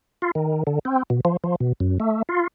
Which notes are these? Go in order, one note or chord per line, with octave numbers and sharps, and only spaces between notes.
F4
D#3
D3
C4
B2
F3
F3
B2
F#2
A3
F4